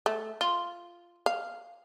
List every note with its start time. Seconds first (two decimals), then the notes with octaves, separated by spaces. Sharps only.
0.06 A3
0.41 F4
1.26 F5